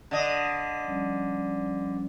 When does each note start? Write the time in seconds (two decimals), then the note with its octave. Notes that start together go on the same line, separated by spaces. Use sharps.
0.11 D3 D#5
0.86 F3 G3 C#4